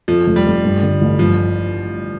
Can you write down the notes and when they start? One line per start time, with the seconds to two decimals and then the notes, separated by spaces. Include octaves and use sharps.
0.08 F2 F3
0.26 F1
0.36 G3
0.45 F1
0.64 G2
0.83 D3
1.01 A1
1.19 G2 F3